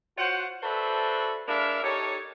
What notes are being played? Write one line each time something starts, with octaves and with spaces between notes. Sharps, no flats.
F4 F#4 C5 C#5 F#5
F#4 A4 B4 C5 D5 E5
G#3 D4 E4 A#4 E5 F5
D#4 G4 A4 C#5